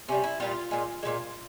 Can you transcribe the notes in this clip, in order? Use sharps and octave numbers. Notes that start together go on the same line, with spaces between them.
C3 G3 C#4
E4
A#2 G3 F4
A#2 G#3
A#2 F3 G#3